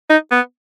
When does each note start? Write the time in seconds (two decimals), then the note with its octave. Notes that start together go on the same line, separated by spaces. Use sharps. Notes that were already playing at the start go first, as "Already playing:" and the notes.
0.10 D#4
0.31 B3